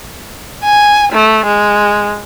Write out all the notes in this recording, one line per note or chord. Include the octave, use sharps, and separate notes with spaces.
G#5
A3
G#3